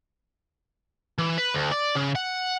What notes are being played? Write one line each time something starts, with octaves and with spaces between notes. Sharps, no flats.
E3
B4
D2
D5
C#3
F#5